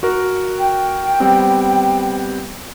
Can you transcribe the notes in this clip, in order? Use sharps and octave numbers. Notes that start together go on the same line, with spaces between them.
F#4 A#4
G5
G3 B3 C4